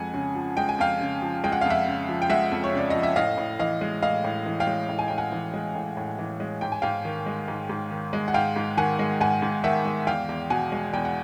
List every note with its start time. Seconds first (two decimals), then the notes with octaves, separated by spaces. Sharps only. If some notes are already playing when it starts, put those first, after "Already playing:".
Already playing: F2 G#3 F#5 G#5
0.14 C#3
0.35 F3
0.57 G#3 G5
0.69 G#5
0.79 F2 F5 G5
1.00 C#3
1.22 F3
1.44 G#3 G5
1.52 F#5
1.61 F2 F5
1.70 E5 F#5
1.87 C#3
2.09 F3
2.22 G5
2.29 G#3 E5 F#5
2.51 F2
2.64 C#5
2.73 C#3 D5
2.90 F3 D#5
3.03 E5
3.16 A2 D#5 F5
3.37 A2
3.59 E3 D#5 F5
3.81 G#3
4.02 A2 D#5 F5
4.24 A2
4.46 E3
4.60 F5 G5
4.67 G#3
4.89 A2
4.99 G#5
5.08 A2 G5
5.18 F#5 G#5
5.32 E3
5.54 G#3
5.75 A2
5.97 A2
6.18 E3
6.40 G#3
6.61 G#2 G5
6.72 G#5
6.82 G#2 F5 G5
7.05 D#3
7.26 G#3
7.48 G#2
7.69 G#2
7.91 D#3
8.13 G#3
8.28 F#5
8.34 G#2 F5 G5
8.56 G#2
8.77 D#3 F#5 G#5
8.99 G#3
9.21 G#2 F#5 G#5
9.42 G#2
9.64 D#3 E5 F#5
9.85 G#3
10.07 E2 F5 G5
10.29 E2
10.50 B2 F#5 G#5
10.72 G#3
10.93 E2 G5
11.05 F#5